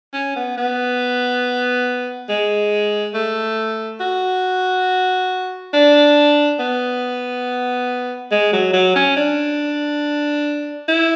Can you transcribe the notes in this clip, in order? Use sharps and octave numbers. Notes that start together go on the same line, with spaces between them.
C#4
B3
B3
G#3
A3
F#4
D4
B3
G#3
F#3
F#3
C#4
D4
E4